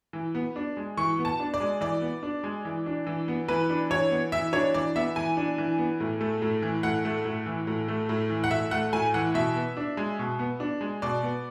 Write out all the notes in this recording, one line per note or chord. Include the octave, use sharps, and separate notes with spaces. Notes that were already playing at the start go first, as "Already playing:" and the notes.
E3
B3
D4
G#3
E3 C#6
B3
A5
D4
D5
G#3
E3 D5
B3
D4
G#3
E3
D4
E3
B3
E3 B4
D4
E3 C#5
B3
E3 E5
D4 C#5
E3 D5
B3 E5
E3 G#5
D4
E3
B3
A2
A3
A2
E3
A2 F#5
A3
A2
E3
A2
A3
A2
E3
F#5
A2 E5
A3 F#5
A2 G#5
E3 F#5
B2 E5
B3
D4
G#3
B2
B3
D4
G#3
B2 D5
B3